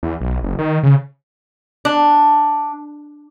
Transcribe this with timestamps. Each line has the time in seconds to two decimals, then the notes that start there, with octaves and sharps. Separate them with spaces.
0.03 E2
0.21 B1
0.43 F#1
0.59 D#3
0.83 C#3
1.85 D4